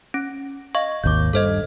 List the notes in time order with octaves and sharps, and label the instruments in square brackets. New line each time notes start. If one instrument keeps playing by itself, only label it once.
[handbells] C#4
D#5 F5 C#6
[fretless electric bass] G#1 D#2 [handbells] D6 G6
[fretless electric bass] G2 [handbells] A4 C5 D#5